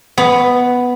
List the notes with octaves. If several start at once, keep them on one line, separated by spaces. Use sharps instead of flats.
B3